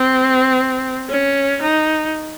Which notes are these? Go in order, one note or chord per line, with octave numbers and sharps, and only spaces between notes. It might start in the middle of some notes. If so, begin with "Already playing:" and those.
Already playing: C4
C#4
D#4